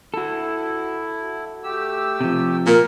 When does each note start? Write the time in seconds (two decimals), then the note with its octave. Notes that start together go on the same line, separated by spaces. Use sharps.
0.14 E4 F#4 A4
1.64 A3 G4 E6
2.21 C3 F3
2.66 A#2 A#4